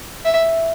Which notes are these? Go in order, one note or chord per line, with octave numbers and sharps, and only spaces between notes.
E5